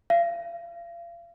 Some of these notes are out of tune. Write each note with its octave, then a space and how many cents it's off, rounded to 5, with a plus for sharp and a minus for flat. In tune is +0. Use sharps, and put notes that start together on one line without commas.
F5 -35